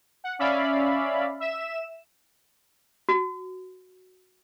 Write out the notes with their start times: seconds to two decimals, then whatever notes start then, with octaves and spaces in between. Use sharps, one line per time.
0.24 F#5
0.39 C#4 D5 E5 F5 B5
1.40 E5 E7
3.09 F#4